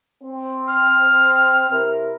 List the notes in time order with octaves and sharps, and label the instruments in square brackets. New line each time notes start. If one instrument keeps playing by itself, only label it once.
[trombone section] C4
[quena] F6
[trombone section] C3 E4 A#4